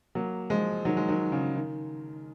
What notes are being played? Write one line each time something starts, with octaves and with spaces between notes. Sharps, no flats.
F#3 A#3
F3 G#3
D#3 F#3
G#3
D#3 F#3
C#3
D#3